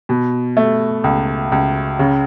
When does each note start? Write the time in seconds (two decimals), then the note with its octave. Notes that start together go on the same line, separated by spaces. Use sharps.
0.09 B2
0.57 A3
1.04 C#2
1.52 C#2
1.99 C#3